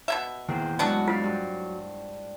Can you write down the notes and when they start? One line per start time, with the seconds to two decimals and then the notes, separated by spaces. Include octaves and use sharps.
0.08 B2 A#3 E5
0.48 E2 A#2 D#3 G#4 C5 G5
0.79 A2 F#3 G#3 B3 D4 F#4
1.08 F4 C5 D5 F5
1.24 G2